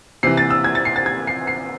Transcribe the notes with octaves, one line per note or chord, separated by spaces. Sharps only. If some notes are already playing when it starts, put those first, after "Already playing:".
C3 E3 C7
A6
E6
G#6
A6
C7
A6
G#6
C7
C7